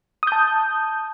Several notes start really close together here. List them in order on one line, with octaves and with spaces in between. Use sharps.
D#6 G6 A5